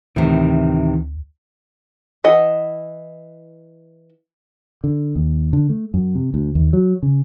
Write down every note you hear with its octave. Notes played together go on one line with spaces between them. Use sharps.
D2 A2 C3 D#3 E3
E3 E4 D#5 F#5
D3
D#2
D3
A3
F#2
C3
D2
D#2
F#3
C#3